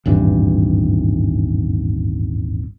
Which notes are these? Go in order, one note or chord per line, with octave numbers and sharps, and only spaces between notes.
D#1 G#1 G2 E3